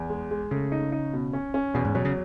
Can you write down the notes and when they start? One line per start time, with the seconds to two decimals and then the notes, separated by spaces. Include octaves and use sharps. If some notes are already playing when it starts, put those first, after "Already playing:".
Already playing: E2
0.10 G#3
0.31 G#3
0.51 C#3 A3
0.72 D#4
0.92 D#4
1.13 B2
1.33 C#4
1.54 C#4
1.74 E2 B2
1.85 G#2
1.95 B2 F#3
2.05 C#3